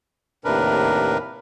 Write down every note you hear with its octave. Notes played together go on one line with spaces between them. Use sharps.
D#2 A2 C3 D4 A#4 B4